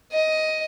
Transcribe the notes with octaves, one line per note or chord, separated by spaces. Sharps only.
D#5